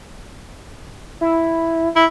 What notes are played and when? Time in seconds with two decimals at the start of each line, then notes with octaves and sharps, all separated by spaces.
1.21 E4
1.96 E4